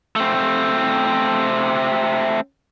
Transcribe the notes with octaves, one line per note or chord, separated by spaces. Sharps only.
A3 C4